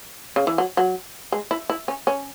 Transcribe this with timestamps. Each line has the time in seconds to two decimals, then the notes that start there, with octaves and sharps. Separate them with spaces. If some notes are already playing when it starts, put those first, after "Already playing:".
0.36 C#3
0.47 E3
0.58 F#3
0.77 F#3
1.32 G#3
1.51 E4
1.70 E4
1.88 C#4
2.07 C#4